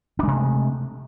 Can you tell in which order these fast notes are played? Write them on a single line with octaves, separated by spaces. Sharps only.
D4 G#3 C3 A3